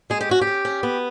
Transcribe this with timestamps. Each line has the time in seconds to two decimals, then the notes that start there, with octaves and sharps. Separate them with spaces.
0.10 G#3 G#4
0.21 G4
0.29 C#4 F#4
0.41 G4
0.47 C#4
0.65 C#4
0.83 B3